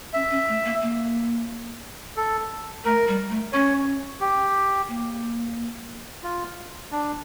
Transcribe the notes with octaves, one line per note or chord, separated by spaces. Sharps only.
C#4 E5
C#4
A3
A#3
A#3
A4
A3 A#4
G3
A3
C#4 C#5
G4
A#3
F4
D4